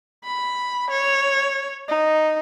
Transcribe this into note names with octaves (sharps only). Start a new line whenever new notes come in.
B5
C#5
D#4